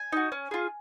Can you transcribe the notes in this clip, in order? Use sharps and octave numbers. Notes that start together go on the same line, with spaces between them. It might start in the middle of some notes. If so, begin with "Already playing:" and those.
Already playing: G#5
D#4 F#4
C#4
F4 G#4